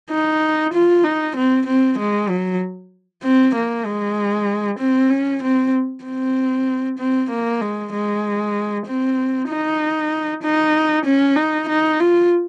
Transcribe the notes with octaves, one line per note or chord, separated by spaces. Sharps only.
D#4
F4
D#4
C4
C4
G#3
F#3
C4
A#3
G#3
C4
C#4
C4
C4
C4
A#3
G#3
G#3
C4
D#4
D#4
C#4
D#4
D#4
F4